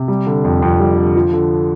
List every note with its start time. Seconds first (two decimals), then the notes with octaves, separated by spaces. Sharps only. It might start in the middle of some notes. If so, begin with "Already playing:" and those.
Already playing: C3
0.08 G3
0.27 D3
0.44 F2
0.62 F2
0.80 G3
0.97 D3
1.15 F3
1.33 D3